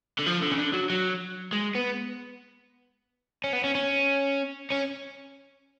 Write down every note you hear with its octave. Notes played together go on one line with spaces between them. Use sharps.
D3
F3
D3
C#3
D3
F#3
F#3
G#3
B3
C#4
B3
C#4
C#4
C#4